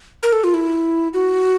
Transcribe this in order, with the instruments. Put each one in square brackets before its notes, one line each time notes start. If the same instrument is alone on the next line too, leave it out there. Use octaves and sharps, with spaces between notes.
[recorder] A#4
A4
F4
E4
F#4